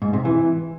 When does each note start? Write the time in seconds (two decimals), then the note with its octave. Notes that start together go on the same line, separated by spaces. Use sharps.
0.02 G#2
0.13 C3
0.25 E3